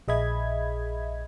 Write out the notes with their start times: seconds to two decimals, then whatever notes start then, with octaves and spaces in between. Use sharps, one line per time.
0.08 A#1 G#4 D#5 E5 B5 G#6